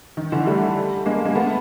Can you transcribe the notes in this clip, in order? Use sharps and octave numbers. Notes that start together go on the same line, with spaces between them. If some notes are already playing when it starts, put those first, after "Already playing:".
D#3
D3 E3
G3 A3
G#3 A#3
G#3 A#3
A3 B3